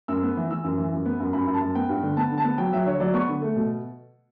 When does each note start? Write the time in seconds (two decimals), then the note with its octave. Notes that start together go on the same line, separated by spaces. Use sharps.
0.08 F#2 E6
0.23 B3
0.37 E3
0.51 E3 E6
0.64 F#2
0.78 E3
0.93 F#2
1.06 B3
1.20 F#2
1.33 F#2 B5
1.47 F#2
1.54 A5
1.61 F#2
1.75 B3 G5
1.89 G2
2.03 D3
2.17 B3 A5
2.31 D3
2.38 A5
2.45 B3
2.58 F#3 G5
2.73 F#3 E5
2.86 D3 C#5
3.00 F#3 D5
3.14 B3 C#6
3.29 D3
3.42 A3
3.56 B2